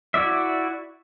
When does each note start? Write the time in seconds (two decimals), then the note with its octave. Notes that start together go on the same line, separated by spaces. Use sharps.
0.14 E4 F#4 D5 E5